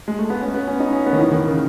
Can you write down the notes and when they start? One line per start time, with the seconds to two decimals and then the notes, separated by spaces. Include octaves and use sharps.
0.08 G#3
0.19 A3
0.30 B3
0.41 C#4
0.54 B3
0.68 C#4
0.80 D#4
0.93 C#4
1.06 B3
1.13 D#3
1.19 E3
1.31 D#3
1.45 C#3